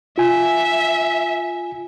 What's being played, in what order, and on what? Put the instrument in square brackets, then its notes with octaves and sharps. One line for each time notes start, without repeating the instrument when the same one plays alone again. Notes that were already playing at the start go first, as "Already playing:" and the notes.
[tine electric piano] F4 G#5 [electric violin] E5